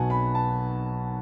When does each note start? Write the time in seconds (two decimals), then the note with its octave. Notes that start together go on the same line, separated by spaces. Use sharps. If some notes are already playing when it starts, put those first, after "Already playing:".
Already playing: B1 B2 F#3 F#5 G#5 A5
0.10 B5
0.35 A5